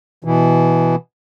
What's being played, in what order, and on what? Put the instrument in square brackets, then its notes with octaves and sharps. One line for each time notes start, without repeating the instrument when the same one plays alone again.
[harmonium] B2 E3